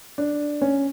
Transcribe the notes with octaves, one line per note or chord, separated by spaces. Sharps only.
D4
C#4